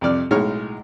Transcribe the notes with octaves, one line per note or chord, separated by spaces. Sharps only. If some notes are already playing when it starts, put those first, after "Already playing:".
C2 F2 D5 F6
B1 A2 G#3 D#4 C#5 F6